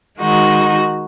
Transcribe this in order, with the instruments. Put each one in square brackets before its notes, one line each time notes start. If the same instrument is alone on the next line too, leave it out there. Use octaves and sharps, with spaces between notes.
[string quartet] D#3 G#3 D#4 F#4